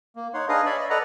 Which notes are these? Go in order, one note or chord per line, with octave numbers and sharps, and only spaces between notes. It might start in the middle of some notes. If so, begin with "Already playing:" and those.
A#3
D#4 C#5 F#5 C6
D4 G#4 B4 D#5 F5
C#5 D5 E5 B5
D#5
A4 B4 D5 D#5 F#5 A#5